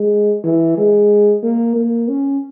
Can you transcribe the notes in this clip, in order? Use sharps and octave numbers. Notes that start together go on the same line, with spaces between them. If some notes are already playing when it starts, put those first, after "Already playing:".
Already playing: G#3
E3
G#3
A#3
A#3
C#4